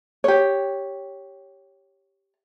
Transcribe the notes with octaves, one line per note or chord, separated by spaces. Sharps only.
G4 C#5